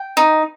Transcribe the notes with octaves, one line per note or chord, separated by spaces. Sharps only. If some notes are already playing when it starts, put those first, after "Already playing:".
Already playing: G5
D#4